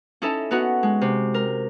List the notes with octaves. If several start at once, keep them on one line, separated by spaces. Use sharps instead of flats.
C#4 D#4 E4 A4
B3 D#4 F#4
G#3
C3
A#4